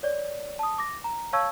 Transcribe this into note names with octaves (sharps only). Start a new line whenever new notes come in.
C#5 D5
A5 D#6
D6 A#6
A#5
C#5 F5 A5 C#6 E6 G#6